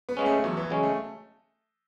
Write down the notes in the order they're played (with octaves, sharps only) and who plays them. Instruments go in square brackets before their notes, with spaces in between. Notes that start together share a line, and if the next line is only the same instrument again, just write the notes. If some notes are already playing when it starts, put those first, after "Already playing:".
[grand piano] B3
[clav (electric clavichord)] C#3 G#3 C#4
[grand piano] A3
[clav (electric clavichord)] E2 [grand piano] F#3
[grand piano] E3
[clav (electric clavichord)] C#3 G#3 C#4 [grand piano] F#3
[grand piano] A3